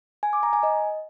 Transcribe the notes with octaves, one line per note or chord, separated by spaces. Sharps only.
G#5
D6
A#5
G#5
D#5